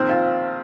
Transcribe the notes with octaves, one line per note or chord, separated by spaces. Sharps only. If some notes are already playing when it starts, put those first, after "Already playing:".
Already playing: A#1 D#3 C4 C5
F4